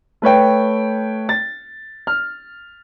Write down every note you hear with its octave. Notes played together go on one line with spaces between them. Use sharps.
A3 B4 C#5 G5
A6
F6